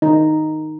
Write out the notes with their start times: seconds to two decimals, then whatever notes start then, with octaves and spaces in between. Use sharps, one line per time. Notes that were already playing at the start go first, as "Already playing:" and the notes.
0.02 D#3 D#4